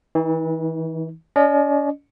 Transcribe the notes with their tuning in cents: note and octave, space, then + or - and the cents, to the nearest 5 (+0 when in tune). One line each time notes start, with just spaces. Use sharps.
E3 -30 D#4 +25
C#4 +40 D#5 -40